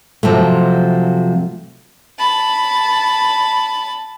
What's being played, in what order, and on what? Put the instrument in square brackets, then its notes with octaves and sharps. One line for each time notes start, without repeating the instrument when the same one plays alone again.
[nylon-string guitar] C3 F3 F#3 A3
[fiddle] A5 B5